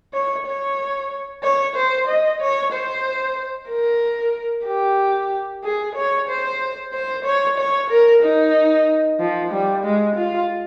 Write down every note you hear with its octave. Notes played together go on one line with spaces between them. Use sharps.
C#5
C#5
C#5
C5
D#5
C#5
C5
A#4
G4
G#4
C#5
C5
C5
C#5
C#5
A#4
D#4
F3
G3
G#3
F4